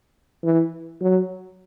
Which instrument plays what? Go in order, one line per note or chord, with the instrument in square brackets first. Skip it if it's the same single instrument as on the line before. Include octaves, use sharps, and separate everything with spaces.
[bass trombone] E3
F#3